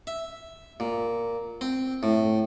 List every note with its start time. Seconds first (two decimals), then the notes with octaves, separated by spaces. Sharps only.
0.07 E5
0.80 A#2
1.61 C4
2.03 A2